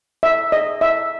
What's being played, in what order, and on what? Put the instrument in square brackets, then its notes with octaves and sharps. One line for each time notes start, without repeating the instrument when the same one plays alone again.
[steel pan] E5
D#5
E5